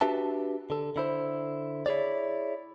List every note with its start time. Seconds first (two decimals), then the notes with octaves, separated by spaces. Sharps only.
0.01 D4 F#4 G4 B4 E5 A5
0.70 D3 A4
0.96 D3 E4 C5
1.86 E4 G#4 C#5 D5